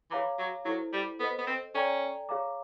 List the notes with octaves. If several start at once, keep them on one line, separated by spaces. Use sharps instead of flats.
E3 G#4 C#5 F5 A#5 D6
F#3
F#3 E4 A4 C5
G3
B3 A4 C5 D#5
B3
C4
C#4 A4 D5 G5 A#5
G#4 C#5 F5 A#5 D6